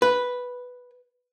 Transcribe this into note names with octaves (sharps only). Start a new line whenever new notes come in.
B4